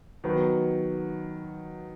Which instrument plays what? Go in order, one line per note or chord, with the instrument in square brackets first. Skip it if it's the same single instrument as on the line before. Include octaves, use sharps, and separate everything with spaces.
[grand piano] D#3 [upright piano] F#3 B3 D#4 F#4 B4